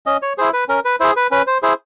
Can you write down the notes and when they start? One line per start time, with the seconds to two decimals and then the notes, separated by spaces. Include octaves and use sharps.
0.06 C#4 D#5
0.22 C#5
0.38 E4 G#4 C5
0.53 B4
0.69 C#4 A#4
0.85 B4
1.00 E4 G#4 C5
1.16 B4
1.31 C#4 B4
1.47 C5
1.63 E4 G#4 C5